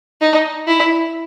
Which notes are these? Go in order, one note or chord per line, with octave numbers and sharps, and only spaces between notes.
D#4
E4